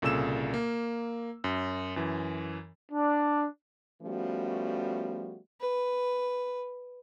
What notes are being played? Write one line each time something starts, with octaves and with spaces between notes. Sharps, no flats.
C2 A#2 C#3 A4 E6 E7
A#3
F#2
F#2 E3
D4
F3 G3 A3 B3 C#4 F#4
B4